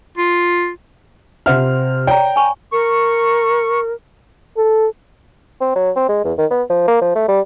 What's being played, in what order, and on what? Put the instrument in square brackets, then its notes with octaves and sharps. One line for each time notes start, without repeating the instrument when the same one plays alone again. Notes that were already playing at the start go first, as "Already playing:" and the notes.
[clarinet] F4
[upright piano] C3 C5 F6 [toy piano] F4 E5 F#5
[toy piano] C#5 D5 [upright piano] G5 A#5
[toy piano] G#5 C#6
[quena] A#4 [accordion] C#6
[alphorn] A4
[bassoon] C4
F#3
C4
G#3
E2
D#3
B3
F3
A#3
F3
A3
G3